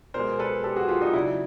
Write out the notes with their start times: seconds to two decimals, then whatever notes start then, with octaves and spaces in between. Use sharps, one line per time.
0.14 B2 G#3 A#4 C5
0.39 A4 B4
0.64 G4 A4
0.76 F#4 G#4
0.88 F4 G4
1.01 D#4 F4
1.13 C#3 F#3 D4 E4